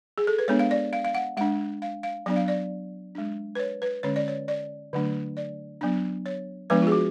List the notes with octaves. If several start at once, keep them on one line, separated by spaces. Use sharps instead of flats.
G#4
A4
B4
G#3 B3 D4 C#5
F5
D5
F5
F5
F#5
G#3 D4 F#5
F5
F5
F#3 B3 D4 D5
F5
D5
G#3 D4
B4
C#5
B4
D3 G#3 C#4 C#5
D5
C#5
D5
D3 F#3 A3 D4
D5
F#3 B3 D4
C#5
F3 G#3 B3 D4 B4
F4 G#4
F#4